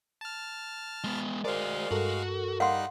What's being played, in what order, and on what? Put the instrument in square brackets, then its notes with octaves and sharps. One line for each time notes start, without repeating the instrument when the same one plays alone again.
[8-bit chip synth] A5 F6
[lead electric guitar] G#3 B3
[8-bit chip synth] G#3 F5 [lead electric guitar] F#4 D5 [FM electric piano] A#4 C5
[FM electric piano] G2 A4 A#4 [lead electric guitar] F#4
[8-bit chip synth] G3 D#4 F#6 [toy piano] F5 F#5 C6